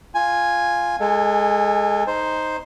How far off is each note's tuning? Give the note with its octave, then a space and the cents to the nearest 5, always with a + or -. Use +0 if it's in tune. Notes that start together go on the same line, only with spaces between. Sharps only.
F4 +0 G#5 +0
G#3 +0 A4 +15 G#5 -30
D#4 +0 C5 +0